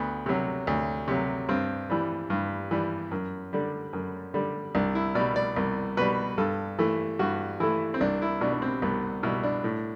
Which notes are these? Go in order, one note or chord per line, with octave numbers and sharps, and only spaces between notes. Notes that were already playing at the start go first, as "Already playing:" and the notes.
Already playing: D2 B3
C3 F#3
D2
C3 F#3
G2 C4
E3 G3
G2
E3 G3
F#2
D3 G3
F#2
D3 G3
C2 D4
E4
B2 G3 D5
D5
C2
B2 G3 B4
G2 A4
E3 A3
G2 F#4
E3 A3 E4
C4
C2 D4
E4
B2 G3 D4
D4
C4
C2 B3
B2 G3 E4
D4
A2